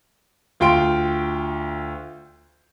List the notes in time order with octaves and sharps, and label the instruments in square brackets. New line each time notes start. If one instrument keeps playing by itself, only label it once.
[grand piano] D2 F4 G5 C6 D7